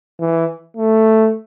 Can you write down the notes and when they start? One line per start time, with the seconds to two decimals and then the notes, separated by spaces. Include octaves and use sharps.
0.20 E3
0.77 A3